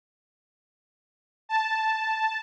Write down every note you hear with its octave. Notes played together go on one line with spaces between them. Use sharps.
A5